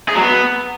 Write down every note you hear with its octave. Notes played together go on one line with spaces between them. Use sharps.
G#4
F#3
B3